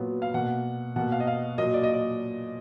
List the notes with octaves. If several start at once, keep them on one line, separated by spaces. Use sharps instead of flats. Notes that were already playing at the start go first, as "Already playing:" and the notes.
Already playing: A#2 F#3 B3
F5
B2 A#3 F#5
B2 A#3 F#5
F5
D#5
F5
A#2 F#3 A#3 D#5
D5
D#5
D5